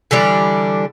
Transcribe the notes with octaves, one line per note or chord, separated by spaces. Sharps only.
D3 E3 G3 D4